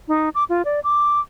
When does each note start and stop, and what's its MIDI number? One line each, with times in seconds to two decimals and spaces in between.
0.08 0.29 63
0.35 0.44 86
0.49 0.62 65
0.65 0.80 74
0.84 1.20 86